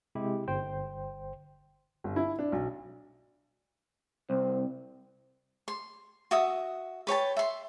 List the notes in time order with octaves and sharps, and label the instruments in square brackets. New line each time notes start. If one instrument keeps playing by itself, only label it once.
[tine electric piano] C3 G#3 E4 G4
G1 C5 G5
[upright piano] G1
E4
D4
B1
[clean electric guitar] C2 [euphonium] C4
[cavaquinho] C6
F#4 E5 D#6
B4 C#5 G5 A5
E5 C6